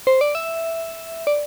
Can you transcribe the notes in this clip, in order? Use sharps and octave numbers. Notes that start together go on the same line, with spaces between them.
C5
D5
E5
D5